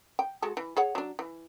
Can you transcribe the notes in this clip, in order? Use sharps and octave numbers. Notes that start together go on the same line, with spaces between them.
G5
G#3 F#4 A4
E3
G#4 C#5 F#5
F#3 D4
E3